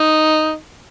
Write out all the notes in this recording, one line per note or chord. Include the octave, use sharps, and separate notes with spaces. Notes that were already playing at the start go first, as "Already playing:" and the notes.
Already playing: D#4